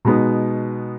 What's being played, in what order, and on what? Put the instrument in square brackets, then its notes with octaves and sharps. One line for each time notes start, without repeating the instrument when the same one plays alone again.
[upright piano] B2 G#3 B3 D#4